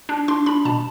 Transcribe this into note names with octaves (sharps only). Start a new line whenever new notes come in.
D4
D4 C6
D4 B5
B2 A5